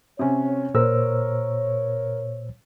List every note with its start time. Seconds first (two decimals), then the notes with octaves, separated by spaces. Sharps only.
0.19 C3 C#4 C#5
0.75 A#2 A#4 C5 E6